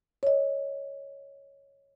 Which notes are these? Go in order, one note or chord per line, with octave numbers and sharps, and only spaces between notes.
C#5 D#5